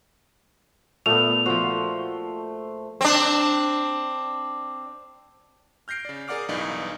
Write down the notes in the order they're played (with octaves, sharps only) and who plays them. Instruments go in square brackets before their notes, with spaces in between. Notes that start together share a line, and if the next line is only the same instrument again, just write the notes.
[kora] A#2 [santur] A3 B3 [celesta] F7
[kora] F3 F4 F#4 [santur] C5
[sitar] C4 D4
[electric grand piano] F6 G6 A#6 C7 D7
C#3 D5
G#4 A#4 D5 F#5 D6 F6
B1 G2 E3 D#4 D5